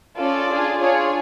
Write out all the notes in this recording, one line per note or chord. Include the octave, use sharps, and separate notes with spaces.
C#4 F4 A4 D5
D4 F4 G#4
D4 F4 G#4 C#5